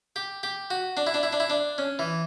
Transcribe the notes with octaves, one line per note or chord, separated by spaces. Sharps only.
G4
G4
F#4
D4
E4
D4
E4
D4
E4
D4
C#4
E3